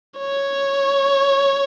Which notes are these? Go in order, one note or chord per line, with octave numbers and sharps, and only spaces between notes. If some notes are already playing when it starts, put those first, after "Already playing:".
C#5